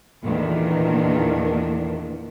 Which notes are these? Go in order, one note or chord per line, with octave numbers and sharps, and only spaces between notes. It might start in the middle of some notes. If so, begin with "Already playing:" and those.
E2 A#2 D#3 A3 D4